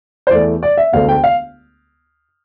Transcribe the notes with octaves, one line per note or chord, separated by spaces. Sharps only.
C5
E2 E3 A3 D5
D5
E5
E1 D2 D3 A3 F5
G5
F5